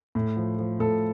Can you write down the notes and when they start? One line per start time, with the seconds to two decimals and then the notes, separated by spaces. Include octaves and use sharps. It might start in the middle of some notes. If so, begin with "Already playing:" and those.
0.15 A2
0.37 F3
0.59 F3
0.79 A2 A4